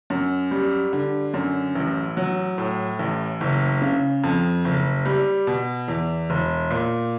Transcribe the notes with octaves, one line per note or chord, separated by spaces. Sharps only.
F#2
G3
D3
F#2
A1
F#3
A2
A1
F#1
C#3
F2
F#1
G3
B2
E2
E1
A#2